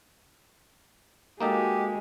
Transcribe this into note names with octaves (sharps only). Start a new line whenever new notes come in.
G#3 A#3 D#4 F#4 G4 A4